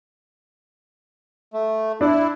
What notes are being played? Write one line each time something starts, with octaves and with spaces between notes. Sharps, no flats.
A3
D4 E4